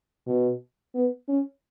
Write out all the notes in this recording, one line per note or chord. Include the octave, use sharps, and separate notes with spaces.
B2
B3
C#4